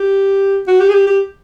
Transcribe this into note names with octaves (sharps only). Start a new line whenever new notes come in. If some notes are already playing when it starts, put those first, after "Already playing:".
Already playing: G4
F#4
G4
G#4
G4
G4